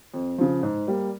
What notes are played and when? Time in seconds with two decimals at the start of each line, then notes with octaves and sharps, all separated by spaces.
0.14 F2
0.38 C#3 F3
0.63 G#2
0.87 G3 A#3